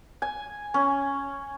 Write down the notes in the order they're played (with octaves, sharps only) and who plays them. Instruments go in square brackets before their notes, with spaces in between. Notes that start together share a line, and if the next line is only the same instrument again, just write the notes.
[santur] G#5
C#4